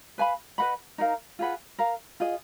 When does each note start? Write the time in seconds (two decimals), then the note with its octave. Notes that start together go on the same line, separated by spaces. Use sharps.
0.18 B4 F5 G#5 B5
0.58 B4 D#5 F#5 B5
0.98 D#4 A#4 F5
1.39 F4 G#4 B4 F#5
1.78 A#4 F5 A#5
2.20 F4 G#4 D#5